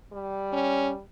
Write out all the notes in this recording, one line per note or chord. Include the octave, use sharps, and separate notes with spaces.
G3
C#4